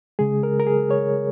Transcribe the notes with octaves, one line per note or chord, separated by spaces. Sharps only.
C#3 G#3 G#4
A#4
A#4
G#4
C#5